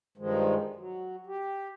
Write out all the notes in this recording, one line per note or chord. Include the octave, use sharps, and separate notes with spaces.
G2 D#3 F3 G#3
F#3
G4